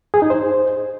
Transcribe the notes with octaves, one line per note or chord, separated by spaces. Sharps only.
G#4
D#4
C5